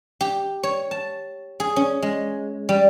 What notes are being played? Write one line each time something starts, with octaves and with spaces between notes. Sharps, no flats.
G4
C#5
A5
G#4
C#4
G#3
G3